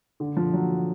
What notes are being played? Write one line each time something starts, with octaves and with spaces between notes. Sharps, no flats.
D3
F3
F#3